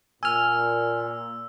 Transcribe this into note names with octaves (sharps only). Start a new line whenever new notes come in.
A#2 G#5 E6 F6